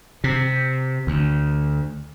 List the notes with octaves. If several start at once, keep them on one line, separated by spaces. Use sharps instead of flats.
C3
D2